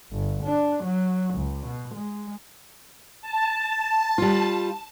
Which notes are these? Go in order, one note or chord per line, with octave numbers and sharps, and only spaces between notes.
G1
D4
F#3
C#2
B2
G#3
A5
G3 F4